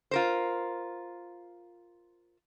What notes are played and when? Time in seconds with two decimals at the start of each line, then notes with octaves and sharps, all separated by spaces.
0.11 F4 A#4 C5